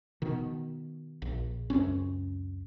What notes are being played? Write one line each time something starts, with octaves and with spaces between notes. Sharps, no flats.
B2 D#3
A#1
C#2 F#2 C4 C#4